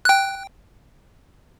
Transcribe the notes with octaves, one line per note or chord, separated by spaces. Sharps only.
G5 F#6